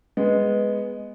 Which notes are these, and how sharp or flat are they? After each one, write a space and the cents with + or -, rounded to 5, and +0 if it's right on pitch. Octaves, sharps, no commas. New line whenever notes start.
G#3 +0 B3 +0